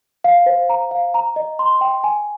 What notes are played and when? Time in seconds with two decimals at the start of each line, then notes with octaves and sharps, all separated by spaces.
0.24 F5
0.46 C5
0.69 A#5
0.91 F5
1.14 A#5
1.36 D#5
1.59 C6
1.81 G5
2.04 G#5